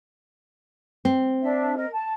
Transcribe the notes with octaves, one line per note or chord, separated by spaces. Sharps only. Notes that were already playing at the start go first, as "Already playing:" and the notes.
C4
D4 E5
A#4 D#5
A5